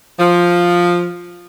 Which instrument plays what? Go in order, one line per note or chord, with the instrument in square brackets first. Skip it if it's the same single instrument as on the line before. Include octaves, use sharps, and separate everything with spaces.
[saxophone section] F3